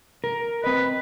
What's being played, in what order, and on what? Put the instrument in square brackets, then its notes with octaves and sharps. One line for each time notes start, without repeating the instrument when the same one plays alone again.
[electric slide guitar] A#4
[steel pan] C4 D#5 [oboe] B4